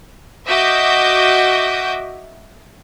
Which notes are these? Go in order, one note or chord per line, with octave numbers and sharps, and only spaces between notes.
F#4 D#5 E5 D6 G6